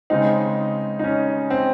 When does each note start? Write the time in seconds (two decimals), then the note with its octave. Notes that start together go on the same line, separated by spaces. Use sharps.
0.10 C#3 G#3 C4 D#4
0.99 D#4
1.04 C#4
1.50 C4